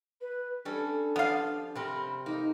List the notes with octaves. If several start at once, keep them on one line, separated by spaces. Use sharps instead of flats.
B4
G3 C#4 D4 A4
F3 B3 D5 F5
C3 C4 A#4 B5
A#3 D#4